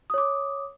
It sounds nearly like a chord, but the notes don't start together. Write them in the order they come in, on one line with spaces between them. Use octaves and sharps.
D#6 C#5 D6